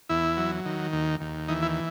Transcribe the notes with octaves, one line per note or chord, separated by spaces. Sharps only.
E2 E4
F#3
D#3
D#2
D#2
E3 D#4
E4